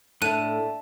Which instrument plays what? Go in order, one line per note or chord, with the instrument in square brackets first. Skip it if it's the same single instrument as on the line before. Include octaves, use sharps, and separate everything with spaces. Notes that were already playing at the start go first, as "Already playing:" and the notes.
[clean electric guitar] A2 [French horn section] D4 A4 [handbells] E5 A5 [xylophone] F#6 D#7